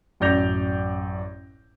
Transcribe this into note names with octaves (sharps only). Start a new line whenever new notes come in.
A1 F#2 D5 G6 A#6 F7